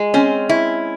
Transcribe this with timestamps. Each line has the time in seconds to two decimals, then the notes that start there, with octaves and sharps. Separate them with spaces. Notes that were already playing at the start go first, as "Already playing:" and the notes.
Already playing: G#3
0.14 C4 C#4
0.49 E4